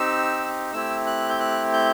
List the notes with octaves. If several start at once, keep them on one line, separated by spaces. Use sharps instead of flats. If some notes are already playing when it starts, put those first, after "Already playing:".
Already playing: C4 D#4 G4 E6
A3 C4 E4 G4 E6
F#6
G6
F#6
G6